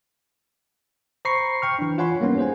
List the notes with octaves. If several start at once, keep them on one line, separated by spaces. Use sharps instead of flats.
C5 A#5 B5 C#6 C7
G5 C#6 F6
E3 D4
F4 C#5 F#5 G#5 B5 C6
G3 A#3 B3 C#4 D#4
G#4 C5 F#5 G#5